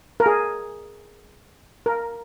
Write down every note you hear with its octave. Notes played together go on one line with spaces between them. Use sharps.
A#4
G#4
A#4